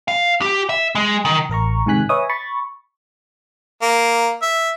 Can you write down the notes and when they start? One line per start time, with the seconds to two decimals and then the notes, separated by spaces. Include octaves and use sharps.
0.08 F5
0.42 G4
0.69 E5
0.95 G#3
1.25 D#3
1.50 A1 A#4 A#5 C#6
1.86 G#2 C3 D#3 G#5 F#6 B6
2.09 B4 C#5 D#5 E5 G#5 D#6
2.29 B5 C#6 A6
3.82 A#3
4.42 E5